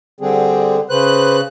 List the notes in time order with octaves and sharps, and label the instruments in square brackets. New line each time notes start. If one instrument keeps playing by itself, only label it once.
[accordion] D3 [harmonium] G3 C4 G#4
[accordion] C#3 F#6 [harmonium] B4 C5